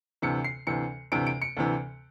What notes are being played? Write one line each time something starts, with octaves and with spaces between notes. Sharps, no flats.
D2 C3 E3 C#7
C7
D2 C3 E3 C#7
D2 C3 E3 D7
D7
C#7
D2 C3 E3